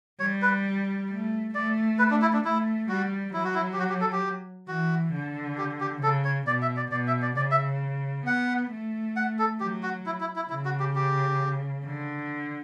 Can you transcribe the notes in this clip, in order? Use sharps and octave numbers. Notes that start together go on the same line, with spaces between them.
G3 C#5
B4
A3
A3 D5
B4
D4
E4
D4
A3 E4
G3 F#4
F#3 E4
F#4
E4
G4
F#4
G4
A4
G4
E3 F#4
D3
G4
G4
C#3 A4
C#5
B2 D5
E5
D5
B2 D5
E5
D5
C#3 D5
E5
B3 F#5
A3
F#5
A4
F#3 G4
F#4
E4
E4
E4
C#3 E4
F#4
G4
G4
D3